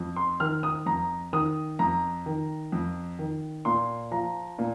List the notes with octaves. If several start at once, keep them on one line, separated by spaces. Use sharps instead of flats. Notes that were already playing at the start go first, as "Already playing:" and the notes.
Already playing: F2
C6
D#3 F6
D#6
F2 A#5
D#3 D#6
F2 A#5
D#3
F2
D#3
A#2 C6
F3 A#5
A#2